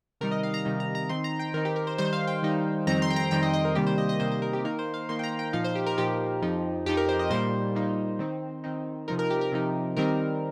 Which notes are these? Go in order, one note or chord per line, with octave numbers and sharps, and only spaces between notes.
C3 D#3 G3 D#4 A#4
D#5
F5
A#5
C3 D#3 G3 D#4
A#5
A#5
D#3 C4 D#4 C6
A#5
G5
D#3 C4 D#4 A#4
G4
A#4
C5
D#3 G3 D#4 C5
F5
G5
D#3 G3 D#4
F2 D#3 G3 C4 D#4 A#5
C6
G5
A#5
F2 D#3 G3 C4 D#4 G5
D#5
D#5
A#4
C3 D#3 G3 A#3 G4
C5
D#5
D#5
C3 D#3 G3 A#3 C5
C5
A#4
G4
D#3 A#3 D#4 A#4
C5
F5
D#3 A#3 D#4 C6
G5
A#5
G5
A#2 F3 D#4 F5
C5
G4
A#4
A#2 F3 D#4 G4
F2 F3 D#4
F2 F3 D#4 G4
A#4
C5
D#5
A#2 G3 A#3 D#4 C5
A#2 G3 A#3 D#4
D#3 C4 D#4
D#3 C4 D#4
C3 F3 D#4 A#4
A#4
G4
A#4
C3 F3 D#4
D#3 G3 C4 D#4 A#4